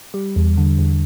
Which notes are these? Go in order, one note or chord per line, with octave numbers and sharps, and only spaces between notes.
G3
E2
D3
E2